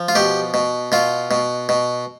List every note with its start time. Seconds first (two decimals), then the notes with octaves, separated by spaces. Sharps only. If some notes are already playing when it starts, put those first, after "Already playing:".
Already playing: F3
0.09 F4
0.15 B2 G4
0.54 B2
0.92 B2 F4
1.31 B2
1.69 B2